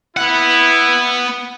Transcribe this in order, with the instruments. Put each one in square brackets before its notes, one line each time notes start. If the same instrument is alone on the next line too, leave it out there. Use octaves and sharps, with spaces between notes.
[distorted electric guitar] B3 F#5 [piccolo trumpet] E4